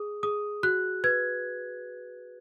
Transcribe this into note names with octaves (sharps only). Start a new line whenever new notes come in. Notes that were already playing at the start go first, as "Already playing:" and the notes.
Already playing: G#4 D#6
G#4 D#6
F#4 F#6
B4 G#6